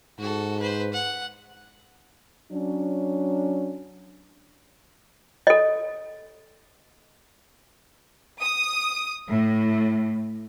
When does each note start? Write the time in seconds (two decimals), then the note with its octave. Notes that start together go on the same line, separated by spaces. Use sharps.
0.19 G#2 F#4 A4
0.60 B4 C5
0.93 F#5
2.51 F#3 C#4 D4
5.47 A4 D#5
8.40 D#6
9.29 A2